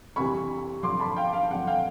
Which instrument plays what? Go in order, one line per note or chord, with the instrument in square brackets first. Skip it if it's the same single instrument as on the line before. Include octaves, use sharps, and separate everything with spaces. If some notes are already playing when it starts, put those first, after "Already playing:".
[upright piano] F2 C3 E3 G3 B5 C#6
G2 D3 F3 C6 D6
A5 B5
F5 G5
F5
F2 D3 F3 F#5
F5 G5